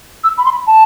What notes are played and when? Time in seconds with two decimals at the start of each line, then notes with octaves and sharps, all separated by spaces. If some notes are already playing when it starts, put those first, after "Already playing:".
0.23 E6
0.37 B5
0.45 C6
0.51 B5
0.66 A5